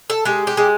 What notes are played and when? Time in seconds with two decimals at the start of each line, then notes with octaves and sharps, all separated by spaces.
0.10 A4
0.25 G#3 G4
0.47 G4
0.57 G#3